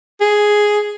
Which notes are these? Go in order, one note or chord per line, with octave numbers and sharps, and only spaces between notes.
G#4